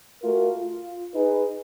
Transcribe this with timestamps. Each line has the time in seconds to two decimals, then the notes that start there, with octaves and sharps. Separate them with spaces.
0.23 A3 F4 F#4 A#4
0.59 F4
1.14 D#4 G#4 B4